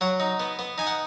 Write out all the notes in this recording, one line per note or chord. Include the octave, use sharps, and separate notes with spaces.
F#3 F#5
D#4
B3
B3
D#4 G#5
F#5